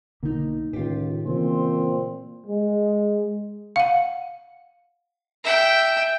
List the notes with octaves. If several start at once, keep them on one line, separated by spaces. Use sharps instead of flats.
B1 D3 A#3 D#4
C#2 A2 D#3 F4 G4
A#2 C#3 E3 A3 C4
G#3
F5 F#5
E5 G5